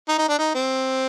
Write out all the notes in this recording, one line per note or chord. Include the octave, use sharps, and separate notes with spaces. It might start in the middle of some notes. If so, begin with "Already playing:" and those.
D#4
D#4
D4
D#4
C4